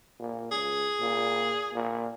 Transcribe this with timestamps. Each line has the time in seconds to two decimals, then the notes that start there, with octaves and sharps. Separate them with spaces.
0.19 A#2
0.52 C#2 G#4
1.00 A#2
1.73 A#2